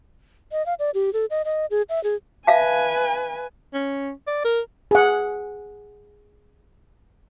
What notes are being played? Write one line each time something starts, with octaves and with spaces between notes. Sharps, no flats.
D#5
F5
D5
G4
A4
D#5
D#5
G#4
E5
G#4
B4 E5 F5 G#5 A5
C#4
D5
A#4
G#4 F#5